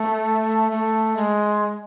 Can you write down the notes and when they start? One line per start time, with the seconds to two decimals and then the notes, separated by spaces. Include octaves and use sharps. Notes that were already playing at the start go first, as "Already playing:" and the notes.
Already playing: A3
0.72 A3
1.17 G#3